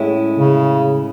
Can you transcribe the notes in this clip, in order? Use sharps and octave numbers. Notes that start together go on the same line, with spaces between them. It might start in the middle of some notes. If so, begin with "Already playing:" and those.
Already playing: A2 G#3 C#4 E4
C#3